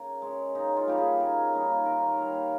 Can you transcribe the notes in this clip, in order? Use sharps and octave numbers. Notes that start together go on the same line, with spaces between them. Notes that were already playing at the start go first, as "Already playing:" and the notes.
Already playing: C#3 A#4
G#3 C#4
C#3 D#4
F4
G3 A#3 D#4 G4
G#4
C#3 A#4
G3 A#3 D#4
D#3 A#4
C#5
G3 A#3 F5
G5